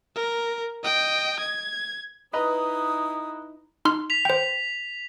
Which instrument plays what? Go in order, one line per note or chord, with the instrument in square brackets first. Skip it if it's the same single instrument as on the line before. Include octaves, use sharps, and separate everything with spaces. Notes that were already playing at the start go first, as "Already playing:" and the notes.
[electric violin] A#4
D#5 G5
G#6
[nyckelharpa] D#4 E4 [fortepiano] B4 D#5 A#5 [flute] D#6
[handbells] D#4 C6 F6
[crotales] B6 F7
[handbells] C5 G5